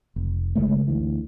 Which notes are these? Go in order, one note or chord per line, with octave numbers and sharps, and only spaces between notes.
F1
G1 C#3 G#3 A3
D2 E3